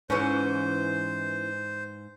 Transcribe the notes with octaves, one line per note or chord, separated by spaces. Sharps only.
G#2 E3 C#4 C5